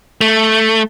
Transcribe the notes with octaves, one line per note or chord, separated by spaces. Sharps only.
A3